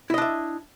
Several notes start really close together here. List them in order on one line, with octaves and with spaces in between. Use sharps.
E4 D#5 D4 E5